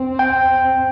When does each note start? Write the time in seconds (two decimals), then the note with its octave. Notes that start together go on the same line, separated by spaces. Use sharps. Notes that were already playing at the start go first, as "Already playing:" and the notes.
Already playing: C4
0.19 G5